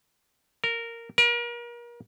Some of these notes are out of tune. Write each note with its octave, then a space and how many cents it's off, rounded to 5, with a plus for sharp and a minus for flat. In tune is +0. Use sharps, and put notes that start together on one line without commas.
A#4 -10
A#4 +35